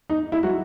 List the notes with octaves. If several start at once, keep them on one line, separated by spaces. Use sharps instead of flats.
D#4
E4
F#3 F#4